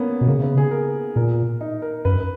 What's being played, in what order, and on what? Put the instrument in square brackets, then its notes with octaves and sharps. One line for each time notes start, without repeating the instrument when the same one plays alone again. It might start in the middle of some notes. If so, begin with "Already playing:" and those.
Already playing: [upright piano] A#3 B3 C#4
[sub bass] B2
[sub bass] C#3 [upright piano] A#3
[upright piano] B3
G#4
A#4
[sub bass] A#2 [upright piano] A#4
[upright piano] D#4
A#4
[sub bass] F#2 [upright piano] B4